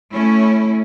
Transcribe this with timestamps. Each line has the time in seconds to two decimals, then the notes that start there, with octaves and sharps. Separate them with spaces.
0.12 A3 C#4 E4